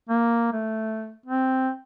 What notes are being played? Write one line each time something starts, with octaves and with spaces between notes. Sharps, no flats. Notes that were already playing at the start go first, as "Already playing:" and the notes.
A#3
A3
C4